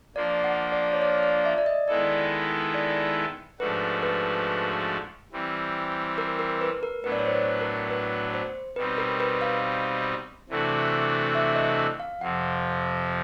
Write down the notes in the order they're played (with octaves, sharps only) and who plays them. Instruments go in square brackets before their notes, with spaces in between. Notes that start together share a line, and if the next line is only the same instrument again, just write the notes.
[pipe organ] F3 A#3 D4 F4 [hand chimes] D5
[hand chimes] F#5
D5
C#5
D5
D5
E5
D5
D#5
[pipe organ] D#3 G#3 B3 E4 A4 [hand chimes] D5
[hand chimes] D5
[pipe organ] G#2 F3 A3 D4 F#4 [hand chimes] B4
[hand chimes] B4
[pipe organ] E3 G3 C4
[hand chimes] A#4
A#4
B4
A#4
[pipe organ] A2 F#3 B3 D4 [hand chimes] B4
[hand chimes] D5
C#5
C5
B4
A#4
B4
C5
[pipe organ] B2 G3 C4 D#4 [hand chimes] B4
[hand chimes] A#4
B4
F5
[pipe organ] C3 E3 A3 D4 F#4
[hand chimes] E5
D#5
F5
[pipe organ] F2 C3 F3 [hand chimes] F#5